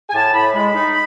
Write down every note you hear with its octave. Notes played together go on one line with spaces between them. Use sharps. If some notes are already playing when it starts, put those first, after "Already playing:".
G#5
A2 A5
A2 B5
G#3 B5
D#4